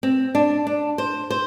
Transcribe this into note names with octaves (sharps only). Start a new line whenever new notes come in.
C4
D4
D4
C5
C5